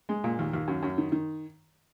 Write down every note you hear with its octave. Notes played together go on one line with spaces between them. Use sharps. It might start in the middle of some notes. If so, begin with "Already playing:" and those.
G#3
A#2
D#2
D#2
F#2
F#2
D#3
D#3